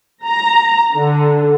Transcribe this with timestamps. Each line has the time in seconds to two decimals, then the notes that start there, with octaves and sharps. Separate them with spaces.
0.24 A#5
0.94 D3